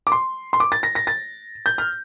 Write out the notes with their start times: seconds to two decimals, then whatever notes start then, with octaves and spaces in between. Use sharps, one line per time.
0.07 D6
0.12 C6
0.53 C6
0.60 D6
0.72 A6
0.83 A#6
0.95 A#6
1.07 A6
1.66 G6
1.78 F6